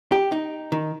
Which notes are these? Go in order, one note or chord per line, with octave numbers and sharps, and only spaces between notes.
G4
D#4
D#3